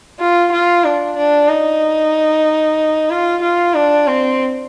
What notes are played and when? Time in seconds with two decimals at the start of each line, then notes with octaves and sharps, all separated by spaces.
0.20 F4
0.52 F4
0.85 D4
1.17 D4
1.48 D#4
3.10 F4
3.42 F4
3.74 D4
4.07 C4